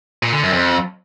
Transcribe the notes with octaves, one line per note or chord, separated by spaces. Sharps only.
A#2
D3
F#2
F2